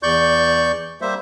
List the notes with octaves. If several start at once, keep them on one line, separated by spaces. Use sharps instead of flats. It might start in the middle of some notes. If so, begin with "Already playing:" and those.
E2 D5 C#6 G6
G3 A#3 C5 E5